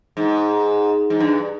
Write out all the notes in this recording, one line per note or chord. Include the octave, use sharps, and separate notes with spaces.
G#2
G#2
G2